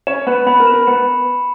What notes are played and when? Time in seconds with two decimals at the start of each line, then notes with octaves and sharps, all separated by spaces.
0.07 C#4 C#5 E7
0.27 B3 B4 B5
0.47 B3 B4 B5
0.60 A#4
0.67 B4 E7
0.74 A#4
0.87 B3 B4 C#7